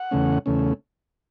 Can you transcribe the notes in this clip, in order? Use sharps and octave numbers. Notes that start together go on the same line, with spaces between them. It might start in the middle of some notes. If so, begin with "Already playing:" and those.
Already playing: F#5
E2 C#3 A3 C#4
E2 C#3 A3 C#4